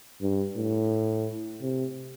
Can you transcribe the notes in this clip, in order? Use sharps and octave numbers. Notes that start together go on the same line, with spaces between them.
G2
A2
C3